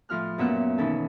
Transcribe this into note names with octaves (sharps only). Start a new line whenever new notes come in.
A2 F3 F4 F6 F#6
F#2 A#2 B3 E5 F#5 F#6
B2 D#3 E3 C#4 D#4 A4